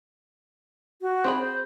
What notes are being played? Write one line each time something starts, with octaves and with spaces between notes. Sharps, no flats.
F#4
C4 G#4 B5
C5